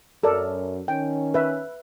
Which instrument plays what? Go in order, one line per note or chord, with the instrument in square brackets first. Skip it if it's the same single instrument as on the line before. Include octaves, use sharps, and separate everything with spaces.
[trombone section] F#2 [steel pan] A4 A#4 D5
[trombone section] D#3 C#4 [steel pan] G5
[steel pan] B4 E5